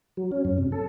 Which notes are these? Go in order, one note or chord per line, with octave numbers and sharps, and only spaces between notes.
F#3
C#4
F#2
C3
A4